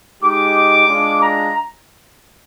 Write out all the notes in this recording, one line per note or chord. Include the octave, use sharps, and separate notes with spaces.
G#3 D#4 G4 D6
G#3 D4 F4
A#5